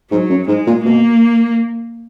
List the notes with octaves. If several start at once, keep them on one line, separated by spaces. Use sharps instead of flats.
G#2 F#3
F#2
G#2 G#3
A#2
B2 A#3